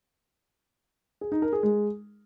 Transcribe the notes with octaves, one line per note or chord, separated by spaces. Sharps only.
G#4
D#4
A#4
G#4
G#3